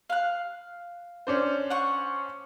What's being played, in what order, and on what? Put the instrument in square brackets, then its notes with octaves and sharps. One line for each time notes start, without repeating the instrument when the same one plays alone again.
[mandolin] F5 F#6
[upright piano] C#4 D4 C5
[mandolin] F#5 C#6